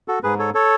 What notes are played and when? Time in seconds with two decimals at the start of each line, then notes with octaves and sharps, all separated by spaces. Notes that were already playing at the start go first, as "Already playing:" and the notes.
0.08 F#4 A4
0.23 G#2 G#4 B4
0.39 A4 C#5
0.54 A4 C#5